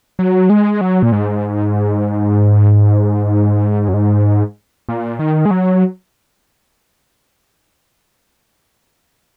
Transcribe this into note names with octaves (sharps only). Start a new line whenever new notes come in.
F#3
G#3
F#3
A#2
G#2
F#2
G#2
A#2
D#3
G#3
F#3